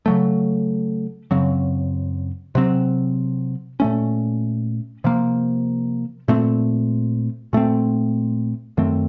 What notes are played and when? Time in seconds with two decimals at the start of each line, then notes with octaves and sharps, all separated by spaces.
0.06 C#3 F#3 A3
1.31 F#2 C#3 F#3 C4
2.55 C3 F#3 C4
3.80 A#2 A3 C#4
5.04 C3 F3 A#3
6.28 A#2 A3 C4
7.53 A#2 A3 C4
8.77 F#2 D#3 A3 C4